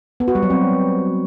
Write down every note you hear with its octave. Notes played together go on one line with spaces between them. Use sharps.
B3
F#4
G3
F#3
C4